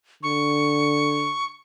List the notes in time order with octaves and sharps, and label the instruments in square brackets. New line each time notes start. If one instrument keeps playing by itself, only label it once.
[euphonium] D3 [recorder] C#6